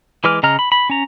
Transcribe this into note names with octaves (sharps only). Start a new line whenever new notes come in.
E3 G#3 B4 D6 F6
C#3 D#5 A#5 F6
B5
B5
C#4 A#5